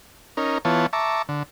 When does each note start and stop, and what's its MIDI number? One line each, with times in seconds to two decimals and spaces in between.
0.37 0.58 61
0.37 0.58 63
0.37 0.58 70
0.65 0.86 52
0.65 0.86 59
0.65 0.86 65
0.65 0.86 73
0.65 0.86 81
0.93 1.22 76
0.93 1.22 81
0.93 1.22 82
0.93 1.22 85
0.93 1.22 86
1.29 1.43 50